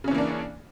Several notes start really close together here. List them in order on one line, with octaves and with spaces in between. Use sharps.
C#3 C#4 E3 A#3 D4